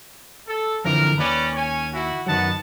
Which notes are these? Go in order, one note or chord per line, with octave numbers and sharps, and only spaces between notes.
A4
F2 D3 E3 A#4
D#2 C#4 B4 D5
C#4 C#5 G#5
E4 F#4
F#2 D#3 F#3 B3 F#5 A5